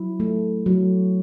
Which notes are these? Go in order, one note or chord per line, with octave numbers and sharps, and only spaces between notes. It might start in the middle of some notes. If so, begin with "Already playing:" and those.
Already playing: F#3 E4
A3
F#3